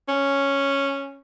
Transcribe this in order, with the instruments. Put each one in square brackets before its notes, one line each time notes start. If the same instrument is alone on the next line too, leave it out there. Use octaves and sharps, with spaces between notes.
[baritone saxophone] C#4